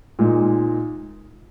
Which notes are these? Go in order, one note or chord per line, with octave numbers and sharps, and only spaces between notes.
A#2 G#3 D#4